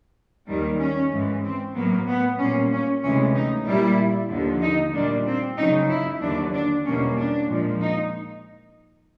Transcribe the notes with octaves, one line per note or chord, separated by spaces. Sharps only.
D#2 D#3 G3
C#4
G#2 E3 G#3
C4
A2 F#3 A#3 B3
B3
A#2 G3 A#3 C#4
C#4
D2 C3 E3 G#3 C#4
D#4
A#2 G3 A#3 E4
D#2 D3 F3
D#4
A#2 G3 A#3 D4
C4
F#2 C#3 F#3 D#4
E4
D#2 D3 F#3 D4
D4
E2 B2 G3 A#3 C#4
D4
A#2 F3 G#3
D#4